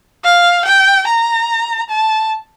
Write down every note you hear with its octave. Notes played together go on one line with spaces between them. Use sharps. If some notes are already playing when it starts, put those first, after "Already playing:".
F5
G5
A#5
A5